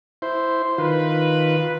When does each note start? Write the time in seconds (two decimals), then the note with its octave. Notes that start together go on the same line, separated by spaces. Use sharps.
0.22 E4 C5
0.78 D#3 F4 B4